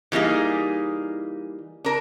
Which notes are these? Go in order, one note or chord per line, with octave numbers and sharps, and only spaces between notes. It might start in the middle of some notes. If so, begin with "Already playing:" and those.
E3 G3 A#3 D#4 G#4
D4 A#4